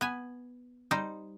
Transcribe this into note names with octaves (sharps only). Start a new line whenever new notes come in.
B3 G#5
G3 D#4 C5